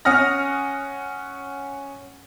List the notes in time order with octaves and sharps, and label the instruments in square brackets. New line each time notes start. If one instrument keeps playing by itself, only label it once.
[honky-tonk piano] C#4 F#5 D#6 F6 A#6